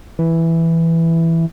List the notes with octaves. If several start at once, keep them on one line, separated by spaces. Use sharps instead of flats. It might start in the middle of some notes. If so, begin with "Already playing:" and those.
E3